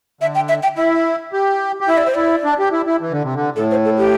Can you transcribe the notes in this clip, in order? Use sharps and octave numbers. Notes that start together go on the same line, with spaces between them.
D3 E5
G5
E5
G5
E4 E5
G4
G4
E4 E5
D5
C5
E4 D5
D4
G4
E4
E4
E3
D3
C3
D3
A2 A4
C5
A4
G4